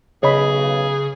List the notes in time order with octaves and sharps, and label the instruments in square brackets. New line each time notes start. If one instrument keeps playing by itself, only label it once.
[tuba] B1 [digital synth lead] C#3 [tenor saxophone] G#4 [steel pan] C#5 D#5 B5